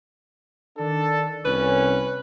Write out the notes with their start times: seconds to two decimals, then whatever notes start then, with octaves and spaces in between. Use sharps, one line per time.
0.78 D#3 D4 A4
1.45 C2 C#4 B4